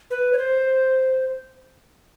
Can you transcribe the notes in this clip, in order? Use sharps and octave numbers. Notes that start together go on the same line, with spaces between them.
B4
C#5
C5